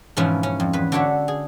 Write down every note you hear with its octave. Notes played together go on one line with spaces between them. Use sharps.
G#2 B2 E3 F3 C#4 E4
C#4
F2
E2 B4
D3 D4 F#4 C#5 E5
G#4